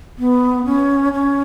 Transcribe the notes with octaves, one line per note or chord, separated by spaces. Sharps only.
B3
C#4
C#4